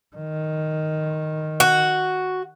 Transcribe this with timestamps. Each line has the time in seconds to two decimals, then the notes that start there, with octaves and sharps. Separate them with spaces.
0.16 D#3
1.60 F#4